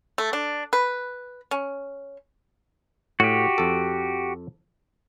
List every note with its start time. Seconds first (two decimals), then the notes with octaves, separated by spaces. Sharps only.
0.18 A3
0.33 D4
0.73 B4
1.51 C#4
3.20 A2 F#4 G4
3.58 F2 A4